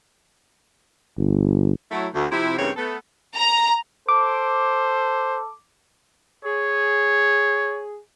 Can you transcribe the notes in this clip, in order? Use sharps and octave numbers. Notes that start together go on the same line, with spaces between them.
G1
F#3 A3 E4
D2
C3 F3 E4
G2 C#3 E3 A#3 C4 C#5
A3 B3 A4
A#5
A4 C5 D6
G#4 C#5